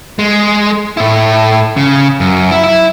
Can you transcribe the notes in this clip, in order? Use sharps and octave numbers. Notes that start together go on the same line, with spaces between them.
G#3
A2 E4
C#3
F#2
E4
E4